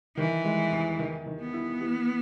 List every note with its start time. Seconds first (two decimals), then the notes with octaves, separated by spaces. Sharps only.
0.17 D#3 E3
0.44 G#3
0.72 E2
0.99 D#3
1.26 D#3
1.40 B3
1.53 E4
1.81 E3